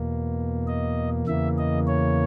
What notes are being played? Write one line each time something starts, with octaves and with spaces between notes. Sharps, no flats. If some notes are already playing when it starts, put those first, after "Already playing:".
Already playing: E2 B2 A#3
D#5
E2 C#3 E3 A#3 E5
D#5
C#5